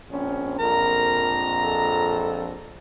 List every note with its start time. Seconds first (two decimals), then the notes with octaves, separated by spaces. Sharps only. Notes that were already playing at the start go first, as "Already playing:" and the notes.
0.11 A#1 C4 C#4
0.60 A#1 F2 A#4 A#5
1.60 A4